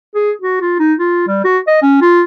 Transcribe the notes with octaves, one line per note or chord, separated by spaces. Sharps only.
G#4
F#4
F4
D#4
F4
G3
F#4
D#5
C#4
F4